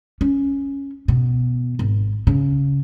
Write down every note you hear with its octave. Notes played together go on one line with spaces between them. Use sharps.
C#4
B2
G#1
C#3